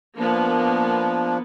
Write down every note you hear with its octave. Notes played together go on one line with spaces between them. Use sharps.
F3 A#3 B3 D4